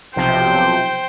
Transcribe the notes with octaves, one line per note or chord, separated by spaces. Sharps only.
B1 C3 F3 C5 G5